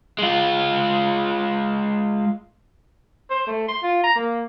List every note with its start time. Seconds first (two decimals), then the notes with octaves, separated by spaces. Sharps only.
0.19 G#3 F4
3.30 C5
3.47 A3
3.68 C6
3.82 F4
4.04 A#5
4.15 A#3